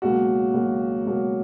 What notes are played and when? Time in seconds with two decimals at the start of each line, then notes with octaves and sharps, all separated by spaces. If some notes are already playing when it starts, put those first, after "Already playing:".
0.02 C#2 B2 F#3 A#3 F#4
0.53 C#2 B2 F#3 A#3
1.05 C#2 B2 F#3 A#3